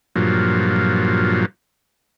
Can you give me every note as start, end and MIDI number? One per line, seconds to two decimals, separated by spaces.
0.16 1.46 43
0.16 1.46 46
0.16 1.46 53
0.16 1.46 54